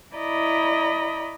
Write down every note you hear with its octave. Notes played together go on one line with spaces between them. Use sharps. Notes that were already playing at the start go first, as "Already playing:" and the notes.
E4 D5 D#5 A#5 B5